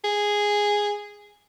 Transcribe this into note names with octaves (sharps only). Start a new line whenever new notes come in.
G#4